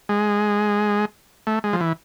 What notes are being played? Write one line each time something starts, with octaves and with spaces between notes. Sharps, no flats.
G#3
A3
G#3
F3
E3